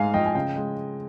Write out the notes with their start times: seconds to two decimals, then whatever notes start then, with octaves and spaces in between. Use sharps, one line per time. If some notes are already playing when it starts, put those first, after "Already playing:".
Already playing: G#2 G#3 F5 G#5
0.14 F3 D#5 G5
0.26 G#5
0.35 C#3 D#5 G5
0.56 G#3